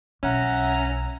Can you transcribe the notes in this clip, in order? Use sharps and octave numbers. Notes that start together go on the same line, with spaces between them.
B1 C#4 E5 F#5 A#5